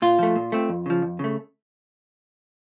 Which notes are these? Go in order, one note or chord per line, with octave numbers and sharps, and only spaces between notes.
A#2 F4
F3 A3
A#2
A3 C4
F2
C#3 F3
F2
C#3 A3